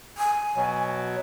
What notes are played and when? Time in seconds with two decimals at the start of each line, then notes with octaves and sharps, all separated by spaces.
0.17 G#5
0.56 B2 F#3